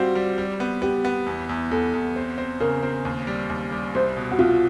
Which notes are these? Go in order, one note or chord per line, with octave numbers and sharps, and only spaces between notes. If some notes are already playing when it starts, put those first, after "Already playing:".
Already playing: G3 C4 F4 F#4
G3
G3
B3
B3 G4
B3
E2
E2
E2 A4
E2
C4
C4
C#3 A#4
C4
D#2
G3
D#2
G3
C2 C5
B2
F#4
C2 F4